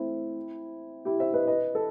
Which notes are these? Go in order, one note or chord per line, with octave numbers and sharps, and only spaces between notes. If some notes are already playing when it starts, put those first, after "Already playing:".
Already playing: A3 C4 E4
E4 G4
C5 E5
B4 D#5
B4 D#5
A4